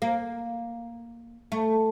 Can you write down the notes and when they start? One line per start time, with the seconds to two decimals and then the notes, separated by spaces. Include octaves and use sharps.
0.02 A#3
1.52 A3